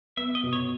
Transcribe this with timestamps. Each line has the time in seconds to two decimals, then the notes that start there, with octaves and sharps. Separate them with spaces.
0.17 B3 E5
0.35 D#5
0.43 B2
0.53 C#5